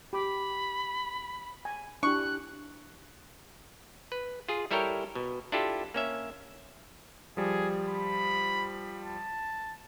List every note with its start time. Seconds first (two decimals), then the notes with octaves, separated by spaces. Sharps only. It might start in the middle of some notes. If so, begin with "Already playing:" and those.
0.13 G4 B5 D6
1.65 G#5
2.03 D4 E4 G4 C#6 F#6
4.12 B4
4.48 F4 G#4
4.71 G3 E4 A4 A#4 C#5 G5
5.15 B2
5.52 D4 E4 F4 G4 A4
5.94 A#3 C#4 E5
7.37 F3 G3 G#4
7.88 B5
9.01 A5